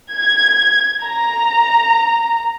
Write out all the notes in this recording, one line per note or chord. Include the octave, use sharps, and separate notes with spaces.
G#6
A#5